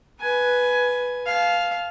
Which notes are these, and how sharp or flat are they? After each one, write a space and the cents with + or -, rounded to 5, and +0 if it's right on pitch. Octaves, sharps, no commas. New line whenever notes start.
B4 +0 G#5 +15
F5 +0 A5 -35